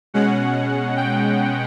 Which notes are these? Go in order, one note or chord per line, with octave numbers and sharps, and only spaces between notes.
B2 G#3 C#4 F#5
G5